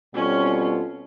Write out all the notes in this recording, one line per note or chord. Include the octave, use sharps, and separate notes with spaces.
B2 G3 C4 C#4 F4 A4